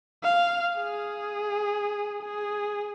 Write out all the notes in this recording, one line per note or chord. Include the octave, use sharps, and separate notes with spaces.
F5
G#4
G#4